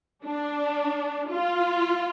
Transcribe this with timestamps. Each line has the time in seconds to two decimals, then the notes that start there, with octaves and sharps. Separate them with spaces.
0.25 D4
1.31 F4